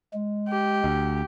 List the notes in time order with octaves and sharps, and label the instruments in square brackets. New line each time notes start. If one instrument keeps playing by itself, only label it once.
[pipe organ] G#3
[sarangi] G4
[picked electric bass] D2